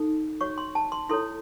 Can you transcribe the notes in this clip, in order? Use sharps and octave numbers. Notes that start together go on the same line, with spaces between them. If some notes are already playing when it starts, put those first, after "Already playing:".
Already playing: D#4 A4
F#4 C#5 C#6
C6
A5
C6
E4 A4 C#5 C6